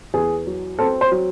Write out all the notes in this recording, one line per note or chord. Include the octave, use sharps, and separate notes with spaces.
E2 G#4
F#3
C4 A4
C5
F#3